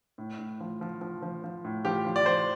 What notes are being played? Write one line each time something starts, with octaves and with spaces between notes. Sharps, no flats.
A2
A2
F3
F3
F3
F3
F3
A2
F3 G4
F3
D5
F3 C5